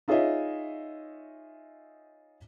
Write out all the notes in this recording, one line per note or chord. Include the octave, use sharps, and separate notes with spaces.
D#4 F4 G#4 C#5 D#5 E5